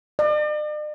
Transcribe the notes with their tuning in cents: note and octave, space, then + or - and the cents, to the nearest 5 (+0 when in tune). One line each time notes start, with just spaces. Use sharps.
D5 +45